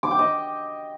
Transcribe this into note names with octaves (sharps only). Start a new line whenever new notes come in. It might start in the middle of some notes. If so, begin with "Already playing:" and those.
D6
G5
D#5